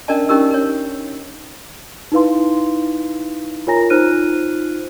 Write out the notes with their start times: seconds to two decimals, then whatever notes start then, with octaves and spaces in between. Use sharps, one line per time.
0.08 C#4 D4 A#4 D5 D#5 A5
0.29 C#4 D#4 G4 A#4 E6
0.50 A#4 C#5
2.12 D#4 E4 B4 F5 C6
3.67 F4 A#4 C#5 G#5 A#5 A#6
3.90 D#4 F4 C5 F6 F#6 D#7